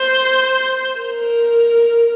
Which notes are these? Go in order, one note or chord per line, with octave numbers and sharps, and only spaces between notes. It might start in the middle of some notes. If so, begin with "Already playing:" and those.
Already playing: C5
A#4